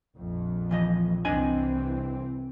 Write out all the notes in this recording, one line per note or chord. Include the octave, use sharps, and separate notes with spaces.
A#1 F2
E3 F3 D#5
C2 E3 C4 D4 D#5 G#5